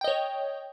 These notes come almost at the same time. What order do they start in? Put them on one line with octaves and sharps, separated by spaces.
G5 D#5 C#5